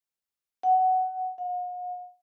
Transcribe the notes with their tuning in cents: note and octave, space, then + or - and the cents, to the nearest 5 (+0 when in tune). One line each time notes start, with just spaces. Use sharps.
F#5 +15
F#5 -45